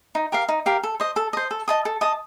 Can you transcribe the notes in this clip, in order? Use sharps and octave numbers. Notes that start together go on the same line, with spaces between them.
D#4
G4 A#4 F5
D#4
G4 A#4 F5
A4
C5 D#5
A4
C5 D#5
A4
D#5 A5 D#6
A4
D#5 A5 D#6